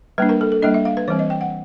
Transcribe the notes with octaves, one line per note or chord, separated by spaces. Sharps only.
G3 A#3 D4 B4
A#4
A4
A4
G3 A#3 D4 D#5
E5
F5
B4
E3 G3 C4 C#5
D#5
G5
F#5